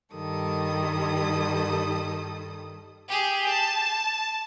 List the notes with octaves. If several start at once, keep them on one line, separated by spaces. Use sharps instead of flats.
G2 D#3 G3 A4 D#6
G4 G#4
A5